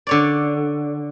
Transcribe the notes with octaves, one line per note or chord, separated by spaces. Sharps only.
D3 C#5 D5